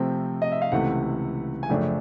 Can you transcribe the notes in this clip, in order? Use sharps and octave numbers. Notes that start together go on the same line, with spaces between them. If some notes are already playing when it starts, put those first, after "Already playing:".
Already playing: C3 F3 A3 C4 G5
D#5
E5
F5
C#2 C3 E3 A3 F#5
G#5
F#2 C#3 F3 A3 D4 G5